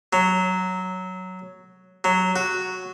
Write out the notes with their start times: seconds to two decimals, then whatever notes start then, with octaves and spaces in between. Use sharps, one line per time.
0.13 F#3
2.04 F#3
2.36 F#4